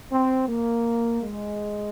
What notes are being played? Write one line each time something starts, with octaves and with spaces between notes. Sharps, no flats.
C4
A#3
G#3